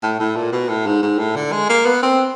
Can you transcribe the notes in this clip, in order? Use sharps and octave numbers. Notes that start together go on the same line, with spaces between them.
A2
A2
A#2
B2
A2
G#2
G#2
A2
D3
G#3
A#3
B3
C4